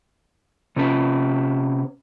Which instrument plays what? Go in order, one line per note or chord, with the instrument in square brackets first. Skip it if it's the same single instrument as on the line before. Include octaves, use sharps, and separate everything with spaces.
[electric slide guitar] C3 C#4 B4